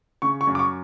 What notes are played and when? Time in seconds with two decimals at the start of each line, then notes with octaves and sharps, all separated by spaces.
0.22 C#3 C#6
0.41 C#6
0.47 F#2
0.55 D6
0.59 C#6